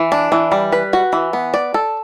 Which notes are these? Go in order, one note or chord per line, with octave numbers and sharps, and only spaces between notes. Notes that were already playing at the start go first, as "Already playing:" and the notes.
Already playing: E3
D4
E3
G3
B4
F#4
E3
B3
D5
A4